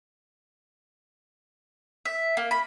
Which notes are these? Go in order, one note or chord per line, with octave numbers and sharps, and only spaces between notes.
E5
A#3
B5